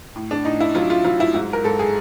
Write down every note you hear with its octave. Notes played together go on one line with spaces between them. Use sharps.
A2
D4
A2 D#4
E4
F#3 F4
F4
F#3 F4
E4
G#2 E4
A#4
G#2 A4
G#4